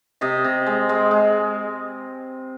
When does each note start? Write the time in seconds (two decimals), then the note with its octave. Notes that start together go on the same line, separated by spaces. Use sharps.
0.21 C3 D#5
0.44 C3
0.66 G#3
0.89 G#3
1.11 G#3